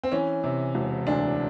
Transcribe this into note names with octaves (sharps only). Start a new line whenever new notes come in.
C4
E3 C#4
C3
E1
D2 D4